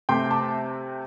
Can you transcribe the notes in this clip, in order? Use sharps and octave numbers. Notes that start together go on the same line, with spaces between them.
C3 A3 C4 G5 C6
A5 D6